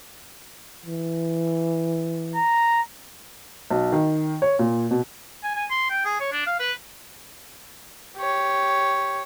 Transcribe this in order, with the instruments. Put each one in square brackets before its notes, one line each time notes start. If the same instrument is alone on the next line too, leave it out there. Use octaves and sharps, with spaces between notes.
[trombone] E3
[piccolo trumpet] A#5
[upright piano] B1
D#3
C#5
A#2
B2
[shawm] G#5
G#5
C6
G5
G#4
C#5
D4
F5
B4
[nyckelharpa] G4 C#5